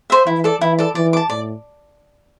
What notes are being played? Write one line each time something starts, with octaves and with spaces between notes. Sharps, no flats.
C5 E5
E3 E4
A4 D5
E3 E4
A4 D5
E3 D5
A5 D6
A2 D5